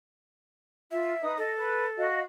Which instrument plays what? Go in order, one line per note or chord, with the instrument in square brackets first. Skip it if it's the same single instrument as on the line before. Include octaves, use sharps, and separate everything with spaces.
[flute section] F4 [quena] E5
[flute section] D#4 B4 D#6
[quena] A4 [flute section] D#5
[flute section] B4
F#4 D#5 F5